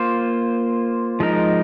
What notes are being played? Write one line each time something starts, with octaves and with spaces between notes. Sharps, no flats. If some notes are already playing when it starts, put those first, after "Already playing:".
Already playing: A#3 F4 C5
F3 G#3 D#4 A#4